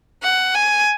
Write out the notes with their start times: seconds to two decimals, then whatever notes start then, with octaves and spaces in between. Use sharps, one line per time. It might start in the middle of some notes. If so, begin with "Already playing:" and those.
0.23 F#5
0.55 G#5